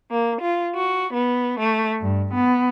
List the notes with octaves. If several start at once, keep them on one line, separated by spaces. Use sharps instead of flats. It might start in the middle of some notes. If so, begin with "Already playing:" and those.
A#3
F4
F#4
B3
A3
G2
B3